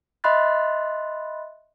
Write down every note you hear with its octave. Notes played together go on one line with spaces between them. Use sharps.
D#5 E5 B5 C6 F#6 A6